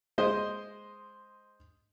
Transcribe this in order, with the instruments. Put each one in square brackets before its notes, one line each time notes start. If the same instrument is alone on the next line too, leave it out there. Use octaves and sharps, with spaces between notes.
[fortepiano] G#3 C5 D#5